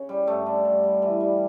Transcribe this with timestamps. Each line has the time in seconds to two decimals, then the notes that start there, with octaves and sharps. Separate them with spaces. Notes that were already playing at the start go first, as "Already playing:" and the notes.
Already playing: C#3
0.09 G3
0.27 G2 A3
0.46 D3
0.65 G2
0.83 G3
1.02 E3
1.20 G3